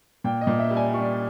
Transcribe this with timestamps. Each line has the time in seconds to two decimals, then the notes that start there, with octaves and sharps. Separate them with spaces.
0.24 A#2 G5
0.41 D#5
0.47 A#2
0.59 E5
0.70 G3
0.77 G#5
0.93 G3 C#6